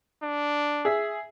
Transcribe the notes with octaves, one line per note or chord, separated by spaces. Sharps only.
D4
G#4 E5